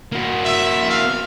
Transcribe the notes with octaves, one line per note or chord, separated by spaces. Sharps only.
A#3 F#4
E5
F5